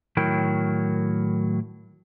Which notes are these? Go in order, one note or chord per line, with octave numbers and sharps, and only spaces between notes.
A2 D#3 F#3 E4 A#4 G5